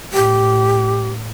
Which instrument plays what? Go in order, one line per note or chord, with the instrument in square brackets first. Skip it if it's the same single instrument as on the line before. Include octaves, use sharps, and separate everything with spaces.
[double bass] A2 [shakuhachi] G4